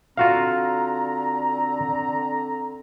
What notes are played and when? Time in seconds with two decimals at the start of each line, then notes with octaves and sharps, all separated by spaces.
0.17 D3 C4 F4 F#4 F5 A#5